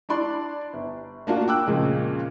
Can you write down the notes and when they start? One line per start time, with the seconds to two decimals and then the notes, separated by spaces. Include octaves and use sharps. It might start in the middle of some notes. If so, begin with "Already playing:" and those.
0.09 D4 E4 D5 C6
0.73 G1
1.27 A#3 D4 F4 F#4
1.48 G5 D6 E6 F#6
1.67 F2 A#2 C#3 G#3